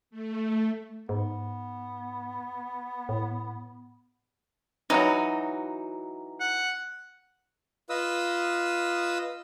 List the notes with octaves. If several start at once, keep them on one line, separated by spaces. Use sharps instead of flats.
A3
G#2 B3
A2
E3 F#3 D#4 F#4
F#5
F4 B4 D#5 D#6 E6